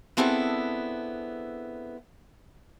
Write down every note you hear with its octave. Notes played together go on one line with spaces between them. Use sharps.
B3 C4 D4 E4 G#4 A4